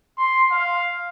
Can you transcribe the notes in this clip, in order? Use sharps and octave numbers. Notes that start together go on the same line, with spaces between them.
C6
F5